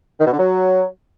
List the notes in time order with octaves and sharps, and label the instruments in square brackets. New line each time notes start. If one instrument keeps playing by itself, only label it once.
[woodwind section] D#3
B2
D3
F#3